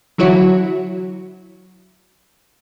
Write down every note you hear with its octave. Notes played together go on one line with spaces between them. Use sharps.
D3 E3 F#3 E4 F#4 C#5